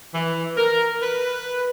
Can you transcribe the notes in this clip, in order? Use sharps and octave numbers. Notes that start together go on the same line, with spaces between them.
E3
A#4
B4